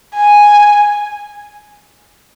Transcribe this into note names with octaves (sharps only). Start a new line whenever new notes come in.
G#5